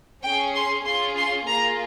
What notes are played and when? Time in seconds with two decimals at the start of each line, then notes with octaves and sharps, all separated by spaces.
0.23 C#4 G#4 G5
0.55 C6
0.85 C#4 F4 G#4 C6
1.16 C6
1.47 A#3 F4 G#4 A#5